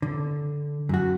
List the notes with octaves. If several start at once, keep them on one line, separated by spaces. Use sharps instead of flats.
D3
F#2 F#4